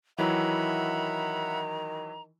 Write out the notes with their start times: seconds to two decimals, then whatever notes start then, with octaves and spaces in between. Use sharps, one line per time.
0.18 D#3 E3 F#3 E4 E5 F#5 A#5 B5